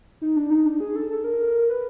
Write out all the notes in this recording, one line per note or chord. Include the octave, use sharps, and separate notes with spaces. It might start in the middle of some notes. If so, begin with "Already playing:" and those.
D#4
D4
D#4
D4
G#4
A4
A4
A#4
B4